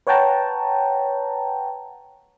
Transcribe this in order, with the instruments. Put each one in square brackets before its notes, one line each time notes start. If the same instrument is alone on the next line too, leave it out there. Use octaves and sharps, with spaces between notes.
[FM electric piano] B4 C#5 F#5 G5 A5 A#5